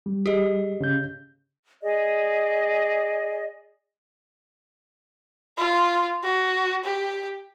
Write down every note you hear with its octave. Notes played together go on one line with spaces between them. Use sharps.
G3
G4 G#4 D#5
C#3 C#4 G6
G#4 D5 D#5
F4
F#4
G4